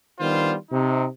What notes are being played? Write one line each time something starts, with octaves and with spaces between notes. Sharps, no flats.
D#3 G3 B3 D4 F4 C5
C3 D#4